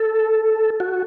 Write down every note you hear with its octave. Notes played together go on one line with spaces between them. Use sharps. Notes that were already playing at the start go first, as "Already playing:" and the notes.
Already playing: A4
F#4